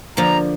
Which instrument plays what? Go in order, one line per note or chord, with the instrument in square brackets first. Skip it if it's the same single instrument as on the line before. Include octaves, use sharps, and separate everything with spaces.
[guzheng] D3 F3 A#3 [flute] A#5